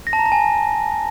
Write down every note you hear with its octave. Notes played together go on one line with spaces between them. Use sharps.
A#6
A5
A#5
A5
G#5